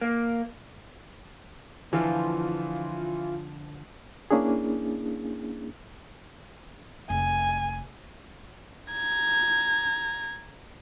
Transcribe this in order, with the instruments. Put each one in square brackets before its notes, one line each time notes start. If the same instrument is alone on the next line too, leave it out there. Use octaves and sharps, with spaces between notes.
[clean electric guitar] A#3
[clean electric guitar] D3 F3 [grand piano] E3 [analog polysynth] F4
[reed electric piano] A#3 C#4 D4 E4 G#4
[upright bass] F1 [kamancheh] G#5
[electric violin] A#5 G#6